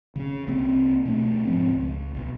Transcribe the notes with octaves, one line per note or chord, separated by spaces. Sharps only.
C#3 C#4
C2 A#3 C4
B2 A3 D4
G#2 F3 C4
C#2
B1